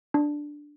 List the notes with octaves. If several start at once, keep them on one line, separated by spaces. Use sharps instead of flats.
D4